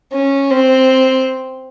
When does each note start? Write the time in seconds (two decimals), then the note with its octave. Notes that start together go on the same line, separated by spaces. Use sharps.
0.12 C#4
0.50 C4